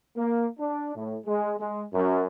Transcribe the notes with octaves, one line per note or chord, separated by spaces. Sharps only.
A#3
D4
A2
G#3
G#3
F#2